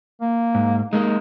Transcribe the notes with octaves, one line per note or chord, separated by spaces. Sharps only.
A#3
G#2
G#3 A#3 D#4